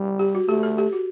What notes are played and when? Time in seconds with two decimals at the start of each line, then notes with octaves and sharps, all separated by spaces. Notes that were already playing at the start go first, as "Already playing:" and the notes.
Already playing: G3
0.19 G4
0.35 F#4
0.48 A3 G4
0.63 A4
0.78 G4
0.93 F#4